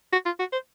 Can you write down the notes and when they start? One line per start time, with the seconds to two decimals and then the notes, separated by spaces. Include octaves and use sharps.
0.13 F#4
0.26 F4
0.39 F#4
0.53 C5